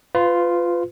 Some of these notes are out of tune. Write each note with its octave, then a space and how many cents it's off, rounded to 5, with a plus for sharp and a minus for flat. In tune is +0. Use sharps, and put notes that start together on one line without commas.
F4 +0 B4 +30